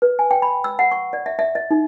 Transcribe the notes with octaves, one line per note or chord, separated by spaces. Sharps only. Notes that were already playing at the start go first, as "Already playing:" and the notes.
B4
G#5
G5
B5
E6
F#5
C#6
D5
E5
E5
D#5
D#4